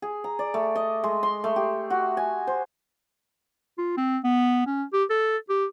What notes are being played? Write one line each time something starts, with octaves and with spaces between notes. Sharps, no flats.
G#4
A#5
D5
A3
D#5
G#3
C6
A3
G4
F#4
G#5
C5
F4
C4
B3
C#4
G4
A4
G4